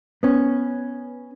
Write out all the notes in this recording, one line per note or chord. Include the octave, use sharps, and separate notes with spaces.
B3 C#4